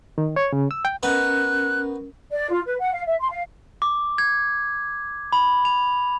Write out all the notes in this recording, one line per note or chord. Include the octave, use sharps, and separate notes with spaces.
D#3
C#5
C#3
E6
G5
B3 C#4 D#4 A#4 F#6
D5
F4
B4
F#5
F5
E5
C6
F5
D6
G#6
B5
F7